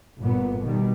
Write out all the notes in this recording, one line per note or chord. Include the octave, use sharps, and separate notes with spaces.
G1 A#2 B3
B2 D#3 G3